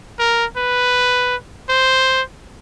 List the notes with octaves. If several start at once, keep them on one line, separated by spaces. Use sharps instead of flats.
A#4
B4
C5